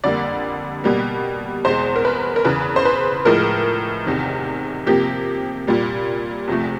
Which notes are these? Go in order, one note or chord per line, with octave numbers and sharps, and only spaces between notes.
F2 D3 G3 A#3 D5
B2 G3 A#3
E2 B2 G#3 C5
A#4
B4
A#4
E2 C#3 E3 B4
C5
B4
A2 F3 G#3 A#4
E2 C3 D#3
C3 F3 A#3 G4
A#2 G3 A#3
E2 C3 F3 A3